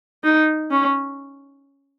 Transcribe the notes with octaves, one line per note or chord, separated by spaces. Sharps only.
D#4
C#4